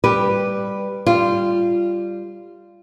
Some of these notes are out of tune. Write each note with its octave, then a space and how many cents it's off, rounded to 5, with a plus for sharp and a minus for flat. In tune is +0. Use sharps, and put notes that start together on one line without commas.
G3 +10 G4 +0 B4 +0
G3 +0 F4 -15